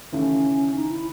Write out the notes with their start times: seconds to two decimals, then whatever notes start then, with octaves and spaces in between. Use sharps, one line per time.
0.12 D#2 C#3 E3 A3 C#4
0.75 D#4
0.91 E4